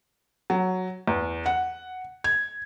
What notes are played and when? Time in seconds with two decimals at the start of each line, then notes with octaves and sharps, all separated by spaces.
0.50 F#3
1.08 E2
1.46 F#5
2.24 G#6